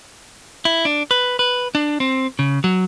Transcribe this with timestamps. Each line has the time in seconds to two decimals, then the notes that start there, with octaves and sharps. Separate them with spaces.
0.65 E4
0.85 D4
1.11 B4
1.39 B4
1.75 D4
2.00 C4
2.39 C#3
2.64 F#3